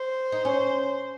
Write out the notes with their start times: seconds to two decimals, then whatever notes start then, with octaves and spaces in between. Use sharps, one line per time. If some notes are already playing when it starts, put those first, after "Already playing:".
Already playing: C5
0.32 D#4
0.45 C#4